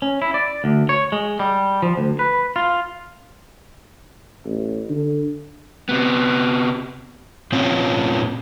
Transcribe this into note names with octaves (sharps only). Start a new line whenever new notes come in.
C#4
E4
D5
D2
C#5
G#3
G3
F3
D2
B4
F4
A1
D3
C3 B3
A#2 C4 C#4 F4